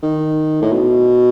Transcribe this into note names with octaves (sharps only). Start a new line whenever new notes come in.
D#3
A2
B2